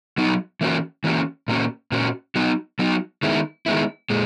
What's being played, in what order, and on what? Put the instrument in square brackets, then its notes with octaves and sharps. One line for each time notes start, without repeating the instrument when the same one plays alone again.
[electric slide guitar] F#3 B3 D#4
E3 A#3 C#4 F#4
E3 A#3 C#4 F#4
A#2 A#3 C#4 F#4
A#2 A#3 C#4 F#4
F#3 B3 D#4 F#4
F#3 B3 D#4 F#4
D#3 G#3 B3 E4
D#3 G#3 B3 E4
A#2 G#3